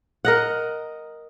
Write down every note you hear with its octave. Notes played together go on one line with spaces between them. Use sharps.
A#4 D#5 F#5